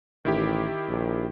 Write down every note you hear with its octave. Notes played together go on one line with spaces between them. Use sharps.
A1 D#3 E4 G4
A#1